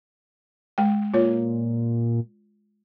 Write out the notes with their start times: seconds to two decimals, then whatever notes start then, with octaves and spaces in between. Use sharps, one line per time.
0.78 G#3 G5
1.14 A#2 F4 C#5